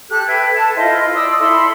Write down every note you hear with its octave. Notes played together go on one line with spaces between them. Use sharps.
G4 A4 F#6
B4 E5 G5 G#6
A4 A5
E4 F4 C5 D#5
D5 C6 D#6 E6
E4 A4 B5 C6